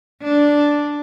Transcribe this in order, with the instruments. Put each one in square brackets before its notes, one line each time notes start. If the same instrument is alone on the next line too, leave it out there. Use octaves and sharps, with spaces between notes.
[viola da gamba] D4